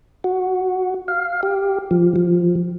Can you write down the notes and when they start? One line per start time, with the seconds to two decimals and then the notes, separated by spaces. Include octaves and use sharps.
0.24 F#4
1.08 F5
1.43 G4
1.91 F3
2.16 F3